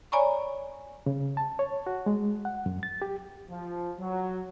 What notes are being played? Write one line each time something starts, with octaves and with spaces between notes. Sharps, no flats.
C#5 D5 G#5 A#5 B5 C#6
C#3
A5
C#5
F#4
G#3
F#5
F#2
A6
G4
F3
F#3